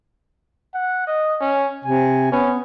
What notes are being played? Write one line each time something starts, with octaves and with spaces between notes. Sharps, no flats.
F#5
D#5
C#4
C3 G#5
B3 C#4